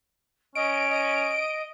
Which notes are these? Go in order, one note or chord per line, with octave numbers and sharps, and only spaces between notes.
C#4 D#5 D7
D#5